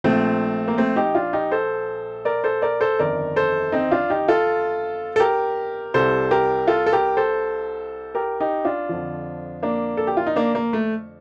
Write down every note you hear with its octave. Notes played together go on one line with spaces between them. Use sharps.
A#1 A#2 F3 A3 C4
A#3
A3 C4
D#4 G4
D4 F4
D#4 G4
A4 C5
A#4 D5
A4 C5
A#4 D5
A4 C5
G1 F2 D#3 A#4 D5
A4 C5
C4 D#4
D4 F4
D#4 G4
F4 A4
A4
G4 A#4
C2 C3 G3 A4 C5
G4 A#4
F4 A4
A4
G4 A#4
A4 C5
G4 A#4
D#4 G4
D4 F4
F2 D3 F3
A#3 D4
A4
G4
F4
D#4
A#3 D4
A#3
A3